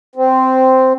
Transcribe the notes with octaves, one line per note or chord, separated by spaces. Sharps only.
C4